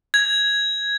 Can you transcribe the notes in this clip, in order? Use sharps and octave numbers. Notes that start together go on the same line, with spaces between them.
G#6